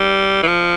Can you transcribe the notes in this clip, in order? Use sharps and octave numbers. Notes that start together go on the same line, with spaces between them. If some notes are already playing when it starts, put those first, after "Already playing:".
Already playing: G3
E3
F3